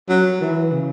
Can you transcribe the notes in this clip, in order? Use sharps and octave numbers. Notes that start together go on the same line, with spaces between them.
F#3
E3
C#3